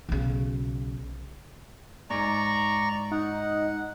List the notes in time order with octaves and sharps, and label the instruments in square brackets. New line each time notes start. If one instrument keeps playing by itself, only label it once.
[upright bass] B1 C#3
[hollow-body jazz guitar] G#2 [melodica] D5 A#5 C#6
[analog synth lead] D#4 [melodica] F#5